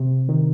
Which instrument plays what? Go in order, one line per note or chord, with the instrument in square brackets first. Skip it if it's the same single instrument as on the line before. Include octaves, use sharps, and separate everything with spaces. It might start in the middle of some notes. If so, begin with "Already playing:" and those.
Already playing: [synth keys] C3
D#3